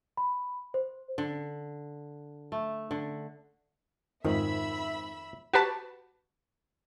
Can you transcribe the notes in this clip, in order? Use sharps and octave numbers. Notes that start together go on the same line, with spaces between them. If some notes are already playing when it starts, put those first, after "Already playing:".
B5
C5
D3
A3
D3
F2 G#2 D#3 F3 E5 B5 E6
F#4 G4 B4 A5